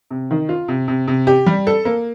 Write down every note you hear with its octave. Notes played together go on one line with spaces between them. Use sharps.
C3
D#3
F4
C3
C3
C3
G4
G3
A4
A#3